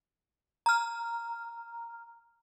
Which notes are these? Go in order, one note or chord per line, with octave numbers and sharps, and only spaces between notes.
A#5 F6